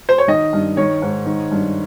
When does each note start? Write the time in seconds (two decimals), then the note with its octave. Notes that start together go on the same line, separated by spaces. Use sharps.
0.09 C5
0.18 C#5
0.28 D#3 D#5
0.53 G2
0.77 D#3 C#5
1.02 G#2
1.26 D#3
1.51 G2